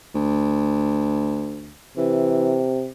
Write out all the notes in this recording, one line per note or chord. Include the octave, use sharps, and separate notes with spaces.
D2
C3 E3